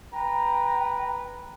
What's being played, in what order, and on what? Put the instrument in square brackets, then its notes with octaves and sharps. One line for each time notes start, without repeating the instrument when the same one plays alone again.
[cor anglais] B4 [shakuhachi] G5 [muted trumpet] A#5